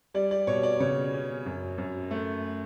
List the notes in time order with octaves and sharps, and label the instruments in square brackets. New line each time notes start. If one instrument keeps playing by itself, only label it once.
[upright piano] G3 D5
D5
B2 C#5
D5
C#3 C#5
C#4
F#2
F#2
A3